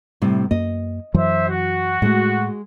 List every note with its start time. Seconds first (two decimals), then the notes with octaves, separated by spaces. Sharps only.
0.22 A2 C3 G3
0.51 F#2 A#3 D#5
1.14 F#2 E3 F#3 C5 E5
1.48 F#4
2.02 A2 G#3 A3